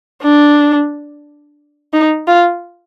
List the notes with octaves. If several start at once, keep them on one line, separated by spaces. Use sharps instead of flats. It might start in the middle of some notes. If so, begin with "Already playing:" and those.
D4
D#4
F4